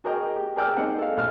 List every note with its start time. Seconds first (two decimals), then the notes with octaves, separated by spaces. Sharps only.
0.04 F#4 G#4 A#4 D#5 G5
0.36 G4
0.56 G#4 A#4 D5 G5 E6 F6
0.77 G#3 C4 D#4 C5 F#5
0.99 A4 F5
1.17 A#1 A4 F6